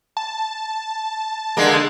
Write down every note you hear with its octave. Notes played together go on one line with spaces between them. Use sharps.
A5
D3 G#3 A#3